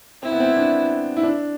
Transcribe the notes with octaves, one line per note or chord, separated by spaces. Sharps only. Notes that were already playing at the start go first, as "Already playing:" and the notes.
C4 E4
B3
C4
D4
E4
D4